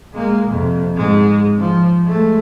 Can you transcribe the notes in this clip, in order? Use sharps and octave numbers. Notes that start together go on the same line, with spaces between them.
G#3 A#3
F2 C3
G#2 G#3
F3
G#3 A3